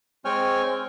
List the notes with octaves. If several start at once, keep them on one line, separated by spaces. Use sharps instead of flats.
G#3 C4 C#5 G5 G#5 F6